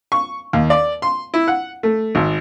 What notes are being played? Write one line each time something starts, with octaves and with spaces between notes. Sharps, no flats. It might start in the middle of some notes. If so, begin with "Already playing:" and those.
C#6
D#2
D5
C6
E4
F#5
A3
G#1